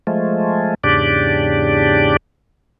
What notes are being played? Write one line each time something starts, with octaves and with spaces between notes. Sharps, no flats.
F3 G#3 A3
E2 G#2 C#3 D4 G4 D5